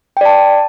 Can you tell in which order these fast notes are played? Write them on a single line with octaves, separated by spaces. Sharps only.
G5 D5 A5